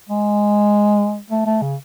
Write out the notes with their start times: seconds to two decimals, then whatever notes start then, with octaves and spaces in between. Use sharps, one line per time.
0.09 G#3
1.31 A3
1.46 A3
1.62 C#3